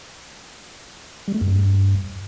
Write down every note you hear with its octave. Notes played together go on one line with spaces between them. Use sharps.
G3
A3
F#2
G2